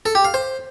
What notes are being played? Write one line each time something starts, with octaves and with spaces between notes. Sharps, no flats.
A4
G4
F5
C5